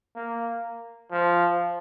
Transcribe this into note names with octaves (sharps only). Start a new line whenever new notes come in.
A#3
F3